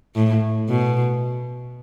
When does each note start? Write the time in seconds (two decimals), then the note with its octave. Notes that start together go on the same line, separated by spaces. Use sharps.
0.16 A2
0.69 B2